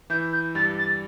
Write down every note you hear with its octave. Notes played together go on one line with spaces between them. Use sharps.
E3 E4 G6
G6
G2 G3 A6
A6